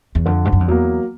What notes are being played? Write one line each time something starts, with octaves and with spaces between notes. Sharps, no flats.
E2
F2 D3
G2
F#2
F2
E2 F#3 A#3